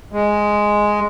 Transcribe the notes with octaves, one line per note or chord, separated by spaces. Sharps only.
G#3